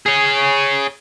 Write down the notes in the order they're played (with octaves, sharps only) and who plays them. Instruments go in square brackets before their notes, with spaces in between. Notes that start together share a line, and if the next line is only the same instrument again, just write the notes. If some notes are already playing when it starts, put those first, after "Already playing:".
[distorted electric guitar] G#4 C#5